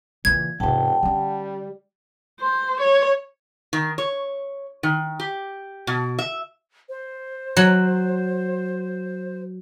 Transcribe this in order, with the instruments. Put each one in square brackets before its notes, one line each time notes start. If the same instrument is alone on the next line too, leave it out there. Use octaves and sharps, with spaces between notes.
[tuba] A#2 [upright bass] C#3 E3 [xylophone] G#6
[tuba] E1 [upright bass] G#2 C3 [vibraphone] F#5 G5 A5
[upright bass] D3 C#4 [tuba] G3
[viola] C5
C#5
[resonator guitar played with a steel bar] D#3
C#5
D#3
G4
B2
E5
[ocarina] C5
[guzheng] F#3